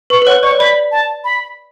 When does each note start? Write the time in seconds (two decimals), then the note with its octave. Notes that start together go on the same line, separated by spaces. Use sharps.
0.10 B4 C#6
0.22 B4
0.27 C#5 F#5
0.43 D5 C#6
0.51 C#5
0.59 D5 B5
0.91 A5
1.24 B5